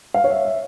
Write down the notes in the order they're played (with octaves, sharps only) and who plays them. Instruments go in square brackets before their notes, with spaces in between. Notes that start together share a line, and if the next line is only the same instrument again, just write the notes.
[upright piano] F5
C#5
E5
E5